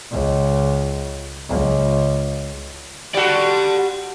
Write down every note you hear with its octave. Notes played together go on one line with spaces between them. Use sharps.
C#2
C#2
G3 F#4 D5 F#5